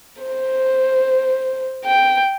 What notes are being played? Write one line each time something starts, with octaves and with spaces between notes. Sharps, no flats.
C5
G5